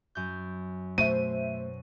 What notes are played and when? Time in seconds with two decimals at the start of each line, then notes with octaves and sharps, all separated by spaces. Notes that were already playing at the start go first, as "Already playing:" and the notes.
0.15 F#2 G6
0.98 B2 A3 F#4 C5 E5 D#7